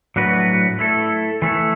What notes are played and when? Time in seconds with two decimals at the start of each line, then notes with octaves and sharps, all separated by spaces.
0.16 A2 F#3 D4 F#4 B4
0.79 A3 E4 A4
1.42 E3 A3 E4 A4